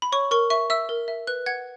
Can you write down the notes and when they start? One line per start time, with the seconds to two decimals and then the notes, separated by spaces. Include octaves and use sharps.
0.02 B5
0.12 C#5 C#6
0.31 A#4 C#6
0.50 E5 C#6
0.70 E5 E6
0.89 A#4
1.08 E5
1.27 B4 F#6
1.46 F#5 G#6